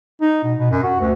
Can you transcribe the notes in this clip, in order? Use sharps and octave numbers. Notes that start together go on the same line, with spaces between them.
D#4
B2
B2
F#2
F#4
D2